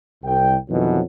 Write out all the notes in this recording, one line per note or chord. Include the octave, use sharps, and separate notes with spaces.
C2 G5
F2 B2 D#3 E3 F#3